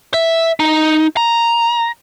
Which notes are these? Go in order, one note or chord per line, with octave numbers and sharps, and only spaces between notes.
E5
D#4
A#5